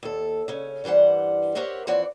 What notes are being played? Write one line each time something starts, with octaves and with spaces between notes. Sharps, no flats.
D#2 A4
C#3 C#4
G2 E3 G3 C5 F#5
G4 A#4 C5 C#5 E5 F#5
E3 F3 C4 C#5 D5 F#5